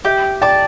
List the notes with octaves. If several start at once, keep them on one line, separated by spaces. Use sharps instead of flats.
G4 E5
D5 G5 A5